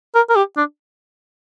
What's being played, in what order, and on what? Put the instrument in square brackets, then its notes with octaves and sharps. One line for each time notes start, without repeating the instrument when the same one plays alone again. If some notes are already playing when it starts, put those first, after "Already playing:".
[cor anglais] A#4
A#4
G4
D4